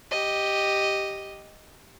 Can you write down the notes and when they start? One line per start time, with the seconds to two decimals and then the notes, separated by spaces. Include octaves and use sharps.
0.11 G4 D#5